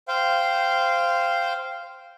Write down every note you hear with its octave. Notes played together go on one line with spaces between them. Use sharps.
C5 F5 G5